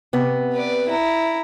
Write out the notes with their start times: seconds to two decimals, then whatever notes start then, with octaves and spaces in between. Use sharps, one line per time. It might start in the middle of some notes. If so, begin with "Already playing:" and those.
0.13 C3 B3
0.53 B4 D5
0.88 E4 A#5